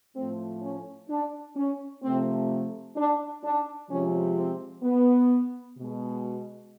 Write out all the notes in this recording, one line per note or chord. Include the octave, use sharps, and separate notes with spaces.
A2 F3 A3 C4
C#4
D4
C#4
C3 F3 A3 C4
D4
D4
C3 F3 G#3 C#4
C4
B3
B2 G#3